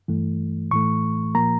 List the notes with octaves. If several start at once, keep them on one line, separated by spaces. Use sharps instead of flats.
G2 E3 A3
A2 E3 A3 C#6
A#2 F3 A#3 A#5